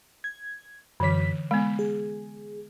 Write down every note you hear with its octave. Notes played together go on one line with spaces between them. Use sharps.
G#6
F#2 D3 E3 B6
G#3 B3 B5
G#4